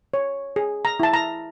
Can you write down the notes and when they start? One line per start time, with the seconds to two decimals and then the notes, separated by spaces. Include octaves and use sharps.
0.14 C#5
0.56 G#4
0.85 A#5
1.00 E4 A5
1.14 A#5